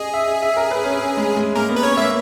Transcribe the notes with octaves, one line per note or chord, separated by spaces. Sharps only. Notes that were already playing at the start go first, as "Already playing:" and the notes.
Already playing: G#4 D#5
E5
E5
A#4
B4
C#4
C#4
G#3
G#3
A#3 A#4
B3
B4
C#4 C#5
A#3 E5